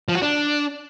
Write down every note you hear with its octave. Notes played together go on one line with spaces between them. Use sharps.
F3
F#4
D4